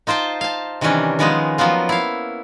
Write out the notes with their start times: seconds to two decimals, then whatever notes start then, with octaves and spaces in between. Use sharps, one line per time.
0.07 D#4 F4 C5 G5 A5
0.41 F5 A5
0.81 C3 D#3 E3 G3 C#4 D4
1.19 D#3 F3 G#3 B3 C#4 D#4
1.58 F3 F#3 A#3 B3 F4
1.89 E4 F5